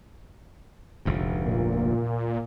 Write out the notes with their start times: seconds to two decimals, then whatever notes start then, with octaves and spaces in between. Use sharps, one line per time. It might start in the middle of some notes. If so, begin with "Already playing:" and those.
1.05 F1 D2 G#2
1.45 A#2